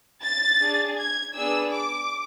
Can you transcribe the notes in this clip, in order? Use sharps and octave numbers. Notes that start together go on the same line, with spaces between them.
A6
D4 G#4
G#6
B3 D4 G#4 E6
D6